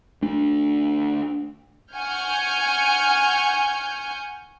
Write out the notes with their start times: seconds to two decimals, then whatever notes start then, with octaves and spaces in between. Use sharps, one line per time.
0.22 A3 D4
1.94 F#5 G#5 C#6 F6 G6